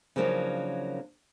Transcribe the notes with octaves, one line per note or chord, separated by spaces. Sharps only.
C#3 F3 F#3 A#3 D4 D#4